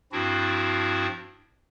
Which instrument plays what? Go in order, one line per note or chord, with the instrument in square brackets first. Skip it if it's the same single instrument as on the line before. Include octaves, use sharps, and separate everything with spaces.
[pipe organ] G2 F3 C4 D4 E4 F#4